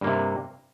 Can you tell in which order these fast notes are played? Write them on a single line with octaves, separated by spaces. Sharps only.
G2 A#3 C3